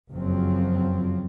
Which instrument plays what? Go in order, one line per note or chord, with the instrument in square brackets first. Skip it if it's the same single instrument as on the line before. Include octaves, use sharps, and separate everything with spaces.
[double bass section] F#1 F2 F3 F#3 C4